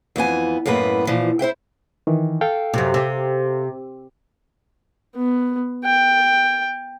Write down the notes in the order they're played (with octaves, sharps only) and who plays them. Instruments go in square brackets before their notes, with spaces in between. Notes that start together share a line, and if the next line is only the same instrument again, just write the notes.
[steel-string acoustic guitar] F2 E3 B3 G#5
F#2 A2 A#3 B3 B4
A#2 E3 F3
E4 C5 E5 G5
[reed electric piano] D#3 E3
A4 F5 G5
[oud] F#2 C3
C3
[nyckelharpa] B3
G5